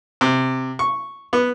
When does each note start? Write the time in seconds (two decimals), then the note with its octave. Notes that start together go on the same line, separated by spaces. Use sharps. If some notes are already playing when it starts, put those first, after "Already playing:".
0.21 C3
0.79 C#6
1.33 B3